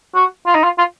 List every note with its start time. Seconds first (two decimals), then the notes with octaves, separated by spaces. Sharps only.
0.15 F#4
0.46 F4
0.55 D#4
0.64 F4
0.78 F4